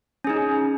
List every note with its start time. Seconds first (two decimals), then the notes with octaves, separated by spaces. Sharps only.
0.24 C#4
0.27 G#4
0.30 D#4